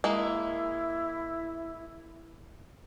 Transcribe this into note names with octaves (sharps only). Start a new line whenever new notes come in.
G#3 A#3 E4